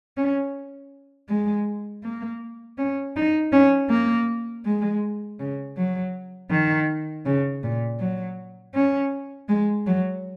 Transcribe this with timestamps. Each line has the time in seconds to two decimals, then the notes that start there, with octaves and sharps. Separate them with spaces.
0.17 C#4
1.29 G#3
2.04 A#3
2.78 C#4
3.16 D#4
3.52 C#4
3.90 A#3
4.65 G#3
5.39 C#3
5.77 F#3
6.50 D#3
7.26 C#3
7.63 A#2
8.00 F#3
8.74 C#4
9.49 G#3
9.87 F#3